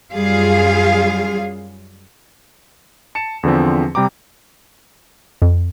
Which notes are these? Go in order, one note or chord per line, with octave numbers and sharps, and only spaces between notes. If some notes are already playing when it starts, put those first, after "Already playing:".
F#2 G3 F4 G#4 F5
A5 C#7 E7
E2 D3 F3 C4
C3 G3 G5 A#5 D6
F2